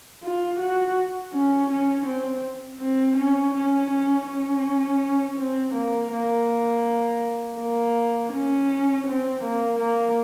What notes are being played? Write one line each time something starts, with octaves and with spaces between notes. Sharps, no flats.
F4
F#4
C#4
C#4
C4
C4
C#4
C#4
C#4
C#4
C4
A#3
A#3
A#3
C#4
C4
A#3
A#3